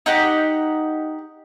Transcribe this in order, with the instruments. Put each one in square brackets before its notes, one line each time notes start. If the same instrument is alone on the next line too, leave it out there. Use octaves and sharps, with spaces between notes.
[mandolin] D#4 G4 F#5